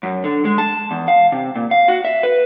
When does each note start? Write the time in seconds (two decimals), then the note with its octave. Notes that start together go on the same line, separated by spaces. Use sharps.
0.03 F#2
0.24 D3
0.45 G#3
0.58 A5
0.91 E2
1.08 F5
1.32 C3
1.55 A#2
1.71 F5
1.88 F#4
2.05 E5
2.23 B4